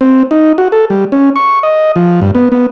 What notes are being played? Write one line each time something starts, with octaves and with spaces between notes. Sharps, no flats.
C4
D#4
F#4
A4
G3
C#4
C#6
D#5
F3
G2
B3
B3